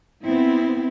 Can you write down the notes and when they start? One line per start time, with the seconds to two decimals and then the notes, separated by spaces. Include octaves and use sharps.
0.24 B3 C4 E4